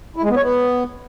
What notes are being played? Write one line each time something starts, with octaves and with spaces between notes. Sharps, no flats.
E4
G#3
B3
C#5
B3